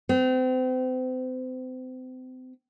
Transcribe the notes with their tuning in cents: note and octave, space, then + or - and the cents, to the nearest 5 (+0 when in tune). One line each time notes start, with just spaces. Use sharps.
C4 -35